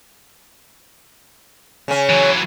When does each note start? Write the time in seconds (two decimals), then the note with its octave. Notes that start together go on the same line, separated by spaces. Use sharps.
1.88 C#3 C#4
2.09 E3 F#3